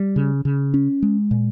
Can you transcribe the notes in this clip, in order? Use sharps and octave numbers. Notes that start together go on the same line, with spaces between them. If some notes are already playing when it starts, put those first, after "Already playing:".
Already playing: G3
C#3
C#3
C#4
G#3
A#2